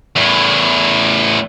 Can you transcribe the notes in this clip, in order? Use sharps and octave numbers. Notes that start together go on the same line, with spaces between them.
E2 A2